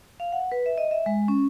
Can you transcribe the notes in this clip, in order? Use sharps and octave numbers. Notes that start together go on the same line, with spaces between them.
F5
F#5
B4
E5
D#5
E5
G#3
C#4